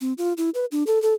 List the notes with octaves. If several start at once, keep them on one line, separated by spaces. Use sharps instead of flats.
C4
F4
E4
B4
D4
A4
A4